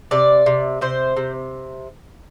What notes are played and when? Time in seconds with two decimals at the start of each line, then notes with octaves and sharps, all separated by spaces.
0.11 C3 D5
0.46 C3
0.81 C3 C5
1.17 C3